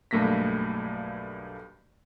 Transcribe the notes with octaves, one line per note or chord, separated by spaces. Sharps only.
B1 G2 A3 A#3 A#6 B6